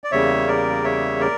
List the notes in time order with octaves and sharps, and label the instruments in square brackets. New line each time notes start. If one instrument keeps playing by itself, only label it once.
[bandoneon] D5
E2 C#3 G3 A#3 C#5 E5
A#4 D5
C#5 E5
A#4 D5